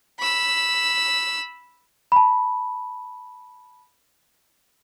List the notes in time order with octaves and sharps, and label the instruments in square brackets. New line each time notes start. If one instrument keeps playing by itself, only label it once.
[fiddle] B5 E6
[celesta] A5 B5